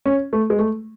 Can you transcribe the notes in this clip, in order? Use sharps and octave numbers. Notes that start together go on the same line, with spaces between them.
C#4
A3
G#3
A3